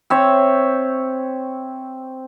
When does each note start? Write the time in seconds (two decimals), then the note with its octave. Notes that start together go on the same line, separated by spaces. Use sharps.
0.10 C4 C#5 E5